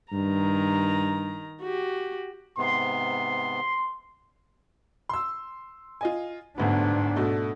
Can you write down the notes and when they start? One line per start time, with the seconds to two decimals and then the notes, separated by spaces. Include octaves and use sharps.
0.12 G2 D#3 A#5
1.63 F#4 G4
2.58 G#2 C3 B3 C6
5.09 C6 E6
6.01 F4 D#5 G#5
6.58 G1 D2 G#2 B3 D4
7.16 B2 A3